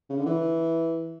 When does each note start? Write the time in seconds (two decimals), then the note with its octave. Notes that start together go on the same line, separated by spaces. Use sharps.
0.10 C#3
0.18 D3
0.26 E3